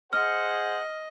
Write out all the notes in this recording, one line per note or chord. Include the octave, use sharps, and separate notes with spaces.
G#4 C5 D#5 F#5 F6